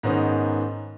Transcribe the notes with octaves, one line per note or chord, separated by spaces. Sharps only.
G#2 D#3 B3 C#4 D#4